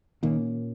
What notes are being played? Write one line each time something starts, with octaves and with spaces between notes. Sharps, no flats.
A#2 D#3 A#3 C#4